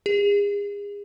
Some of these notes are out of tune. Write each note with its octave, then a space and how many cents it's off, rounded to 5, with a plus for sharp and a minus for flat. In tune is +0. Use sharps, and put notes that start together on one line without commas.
G#4 -35